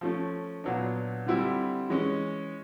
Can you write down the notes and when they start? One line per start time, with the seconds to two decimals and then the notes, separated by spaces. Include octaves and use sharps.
0.01 F3 A3 C#4
0.64 A#2 F#3 B3 D4
1.26 D3 G3 C4 E4 G4
1.90 E3 G#3 C#4